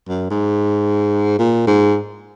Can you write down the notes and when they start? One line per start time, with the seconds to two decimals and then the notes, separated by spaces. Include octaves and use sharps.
0.08 F#2
0.30 G#2
1.39 A#2
1.67 G#2